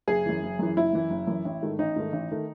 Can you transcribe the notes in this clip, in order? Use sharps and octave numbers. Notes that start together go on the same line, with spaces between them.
F#1 G#4
F#2 E3
F#1
F#2 E3
F#1 E4
F#2 E3
F#1
F#2 E3
A1
G#2 D#3 A3
A1 D#4
G#2 D#3 A3
A1
D#3 A3